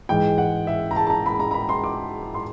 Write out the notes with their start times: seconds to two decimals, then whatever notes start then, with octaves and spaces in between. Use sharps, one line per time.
0.09 G#2 E3 G#3 G5
0.38 F#5
0.67 E5
0.91 A#5
0.96 A5
1.07 A5
1.10 A#5
1.26 B5
1.40 A#5
1.51 A#5
1.54 B5
1.69 C6
1.84 D6
2.34 C6